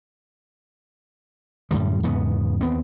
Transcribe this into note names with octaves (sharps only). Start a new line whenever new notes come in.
F#2 A2 D3 G3
E2 G#2 C#3 B3
D#2 B3 C4